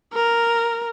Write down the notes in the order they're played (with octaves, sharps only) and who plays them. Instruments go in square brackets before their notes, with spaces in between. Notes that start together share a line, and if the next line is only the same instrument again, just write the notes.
[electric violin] A#4